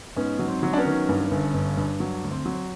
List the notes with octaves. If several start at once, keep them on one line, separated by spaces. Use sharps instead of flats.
G#2 B3 C#4
F#3
C4
F#3
D4
B3 C#4
D#3
G2
G1
G2
G2
F#3
D2
C4
F#3